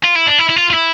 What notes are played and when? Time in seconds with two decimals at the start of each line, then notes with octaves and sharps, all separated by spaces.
0.04 F4
0.16 E4
0.27 D4
0.39 E4
0.50 E4
0.56 F4
0.70 F4
0.74 E4